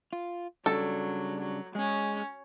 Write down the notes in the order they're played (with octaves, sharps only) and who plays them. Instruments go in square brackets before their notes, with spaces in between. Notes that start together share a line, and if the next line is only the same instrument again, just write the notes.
[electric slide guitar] F4
[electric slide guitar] C#3 G3 D4 [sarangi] F#3 [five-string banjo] A4
[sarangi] F#3
[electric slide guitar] G#3 G#4 [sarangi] C#4